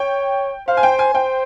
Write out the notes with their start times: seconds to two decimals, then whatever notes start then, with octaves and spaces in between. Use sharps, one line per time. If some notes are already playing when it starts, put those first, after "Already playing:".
Already playing: C#5 G5
0.68 C5 F5
0.77 G#5
0.83 G5
0.99 G#5
1.14 C5 G5